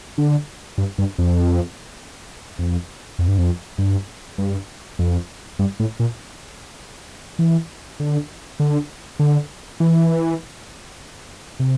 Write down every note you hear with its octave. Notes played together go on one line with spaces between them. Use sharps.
D3
G2
G2
F2
F2
F2
G2
F2
G2
G2
F2
G2
A2
A#2
E3
D3
D3
D3
E3
C3